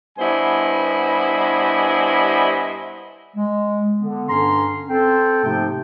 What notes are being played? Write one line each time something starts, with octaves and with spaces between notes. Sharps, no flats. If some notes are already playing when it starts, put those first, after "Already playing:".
G2 B3 E4 C5 D#5 G#5
G#3
D3 B3
G2 D3 C#4 A#5 C6
C4 A4 G5
G#2 C3 F3 A3 A#3 G5